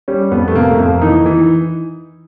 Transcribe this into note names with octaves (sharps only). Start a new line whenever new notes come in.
G3 C#4
F2 B3
A3
C3 A#3
A3
F2 A#3
E3 D#4
E3